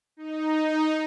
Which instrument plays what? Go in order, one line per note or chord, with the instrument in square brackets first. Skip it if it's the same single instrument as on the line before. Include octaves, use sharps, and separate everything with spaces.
[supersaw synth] D#4